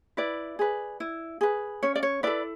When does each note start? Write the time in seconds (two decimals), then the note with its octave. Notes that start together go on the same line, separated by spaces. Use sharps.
0.17 E4 B4 D5
0.59 G#4 B4
1.00 E4
1.41 G#4 B4
1.83 C#4 C#5
1.95 D5
2.03 C#5
2.23 E4 A4 B4 D5